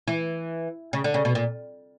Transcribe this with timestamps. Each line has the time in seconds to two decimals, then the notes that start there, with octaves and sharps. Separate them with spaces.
0.08 E3
0.93 C#3
1.04 D3
1.14 C#3
1.25 B2
1.35 A#2